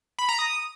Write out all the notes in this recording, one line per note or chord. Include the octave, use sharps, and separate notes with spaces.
B5
A#5
D#6